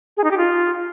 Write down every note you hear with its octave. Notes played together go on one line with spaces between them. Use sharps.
G#4
D#4
G4
F4